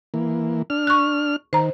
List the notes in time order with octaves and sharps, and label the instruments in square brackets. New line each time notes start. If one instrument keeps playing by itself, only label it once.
[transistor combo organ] E3 A#3
D4 F6
[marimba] C#6 F#6
[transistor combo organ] D#3 [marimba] C5 A#5